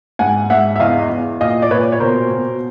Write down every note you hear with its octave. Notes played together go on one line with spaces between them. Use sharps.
G#2 F#5 G#5
G#2 E5 F#5
E5
E2 D#5 F5
E2
A#2 D#5 F5
D5
A#2 B4 C#5
C#5
B2 A#4 C5
B2